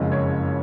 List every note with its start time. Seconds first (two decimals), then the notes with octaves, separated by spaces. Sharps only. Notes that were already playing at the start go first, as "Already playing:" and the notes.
Already playing: F#1 F2 C#3 G#3
0.11 C#5